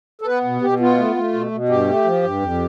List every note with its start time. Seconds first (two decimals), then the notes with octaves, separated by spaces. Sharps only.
0.21 A4
0.26 B3 B4
0.44 B2
0.62 B2 G4
0.80 B3 F4
0.97 A3
1.16 A3
1.33 B2
1.51 B2
1.69 G2 G4
1.87 A3
2.05 F3
2.23 G2
2.40 F2